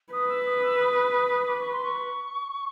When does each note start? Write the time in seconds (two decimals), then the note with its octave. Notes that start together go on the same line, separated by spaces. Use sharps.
0.12 B4 D#6
0.29 E6
0.46 D#6
0.63 E6
0.80 D#6
1.47 D6
1.59 C#6
1.72 C6
1.84 C#6